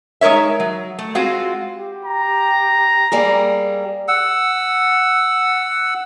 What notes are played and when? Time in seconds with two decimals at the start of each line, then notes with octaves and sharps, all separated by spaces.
0.21 G#3 D#4 A#4 C#5 E5
0.60 F#3
0.99 A3
1.15 G#3 C4 F4 F#4
1.76 G4
2.05 A#5
3.12 G3 A#3 G#4
4.08 F#5 E6